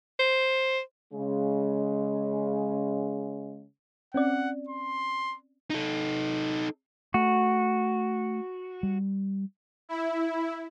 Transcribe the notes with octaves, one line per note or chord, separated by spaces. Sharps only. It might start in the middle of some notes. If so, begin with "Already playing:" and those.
C5
C#3 G#3
C4 C#4 D5 F#5
C6
D#4 A4
A3 F#4
G3
E4